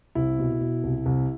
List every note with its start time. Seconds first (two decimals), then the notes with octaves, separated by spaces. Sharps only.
0.15 C2 E4
0.39 B2
0.61 B2
0.84 C2
1.06 C2